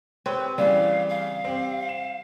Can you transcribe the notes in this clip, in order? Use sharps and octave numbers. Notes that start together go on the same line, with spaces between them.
C4 G4 B4 C#5
C#3 E3 G3 F5
F5
C4 G4
E7